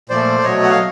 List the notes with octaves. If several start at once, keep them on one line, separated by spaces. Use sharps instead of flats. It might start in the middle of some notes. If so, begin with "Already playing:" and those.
A#2 F3 A3 C5 D5
B2 F#3 A3 C#5 D#5
F#5
F5